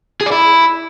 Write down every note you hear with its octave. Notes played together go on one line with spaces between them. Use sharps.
G#4
D5
E4